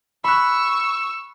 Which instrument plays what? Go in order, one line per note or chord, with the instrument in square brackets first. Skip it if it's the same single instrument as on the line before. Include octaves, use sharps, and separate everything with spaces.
[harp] B5 F#6 [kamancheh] C#6 E6